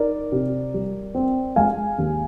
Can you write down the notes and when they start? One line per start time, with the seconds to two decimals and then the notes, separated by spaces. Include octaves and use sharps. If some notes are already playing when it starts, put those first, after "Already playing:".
Already playing: D#4 A#4 D5
0.32 C3
0.74 G3
1.15 C4
1.56 G#3 F5 G#5
1.98 D#2